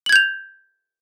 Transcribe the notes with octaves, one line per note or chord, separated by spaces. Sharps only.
G6 G#6 F7 F#7